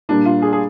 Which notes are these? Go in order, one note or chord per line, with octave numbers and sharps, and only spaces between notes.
A#2 G3 A#3 D4
F4
G#4
G#4